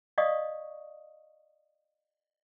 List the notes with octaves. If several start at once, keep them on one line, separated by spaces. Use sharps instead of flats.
D5 D#5 F5 C#6 D#6